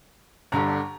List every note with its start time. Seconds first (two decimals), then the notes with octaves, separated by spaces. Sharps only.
0.52 G1 G2 D3 A#5